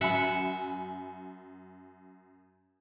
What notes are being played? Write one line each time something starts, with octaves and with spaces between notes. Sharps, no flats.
F#2 E5 F#5 G#5 B5